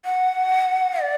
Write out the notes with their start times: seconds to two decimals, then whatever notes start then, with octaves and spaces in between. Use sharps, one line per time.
0.05 F#5
1.01 D5